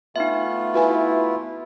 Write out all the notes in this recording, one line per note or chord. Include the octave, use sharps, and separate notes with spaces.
A3 B3 D#4 F4 E5
E4 F#4 B4 G#5